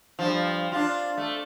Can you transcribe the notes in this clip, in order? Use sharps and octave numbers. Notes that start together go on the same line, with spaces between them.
G2 F3
D4 F4
A3